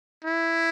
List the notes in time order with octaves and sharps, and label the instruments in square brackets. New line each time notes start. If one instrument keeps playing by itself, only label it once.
[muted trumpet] E4